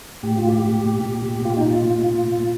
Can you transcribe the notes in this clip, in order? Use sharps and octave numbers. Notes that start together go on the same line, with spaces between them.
A2 G4
F4
A2 G4
A2
A#2
A#2
A#2
A#2 F4
D#4
A#2 F4
A#2
A#2
A#2